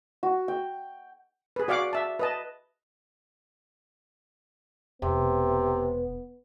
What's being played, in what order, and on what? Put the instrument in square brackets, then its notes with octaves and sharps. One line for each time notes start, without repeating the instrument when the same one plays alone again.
[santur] F#4
G5
[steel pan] G#4 B4
F#4 D5 F5 F#5 D6
E5 A5
B4 D#5 A5
[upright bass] E1 [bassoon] C3 [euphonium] B3